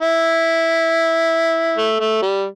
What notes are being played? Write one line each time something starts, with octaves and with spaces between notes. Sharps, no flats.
E4
A3
A3
G3